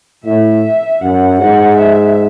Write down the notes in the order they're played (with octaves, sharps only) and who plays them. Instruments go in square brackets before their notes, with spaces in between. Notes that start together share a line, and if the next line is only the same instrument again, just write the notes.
[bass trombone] A2 [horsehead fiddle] E5
[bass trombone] F#2 [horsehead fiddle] F#5
[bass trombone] G#2 [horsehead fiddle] F#5
[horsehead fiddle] E5